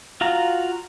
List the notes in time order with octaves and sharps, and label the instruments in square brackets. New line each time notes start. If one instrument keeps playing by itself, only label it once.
[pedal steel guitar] F4 F#4 F5 A#5